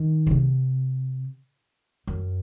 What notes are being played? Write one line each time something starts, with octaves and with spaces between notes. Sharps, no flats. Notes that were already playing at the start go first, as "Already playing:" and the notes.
Already playing: D#3
C#3
C3
F#2